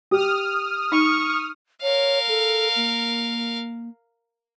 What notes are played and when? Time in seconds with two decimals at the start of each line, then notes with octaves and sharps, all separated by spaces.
0.11 G4 D#6 F6
0.92 D#4 C#6
1.82 A#4 C#5 F5
2.29 A4
2.76 A#3